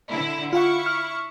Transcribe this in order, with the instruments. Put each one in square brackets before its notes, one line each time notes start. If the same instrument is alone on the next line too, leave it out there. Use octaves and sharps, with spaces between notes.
[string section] D3 E4
[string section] E4 C#6 [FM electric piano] F4 F5 F#5
[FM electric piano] F6